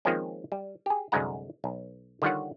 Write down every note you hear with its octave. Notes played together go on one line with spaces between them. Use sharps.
D#3 F3 G#3 A#3 C4 C#4
G3
G4 G#4
C2 F#2 D3 G#3 F#5 A#5
B1
D3 D#3 G3 F4 C#5 F#5